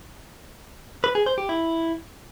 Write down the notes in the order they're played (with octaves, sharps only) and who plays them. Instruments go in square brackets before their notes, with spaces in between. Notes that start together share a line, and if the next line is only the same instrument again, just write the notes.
[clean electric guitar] B4
G#4
C5
G4
E4